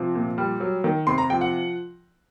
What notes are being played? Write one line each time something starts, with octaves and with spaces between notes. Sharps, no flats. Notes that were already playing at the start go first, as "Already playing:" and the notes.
Already playing: C3 F3
A#2
G3
F#3
D#3
C3 C6
A#5
F3 G5
F#5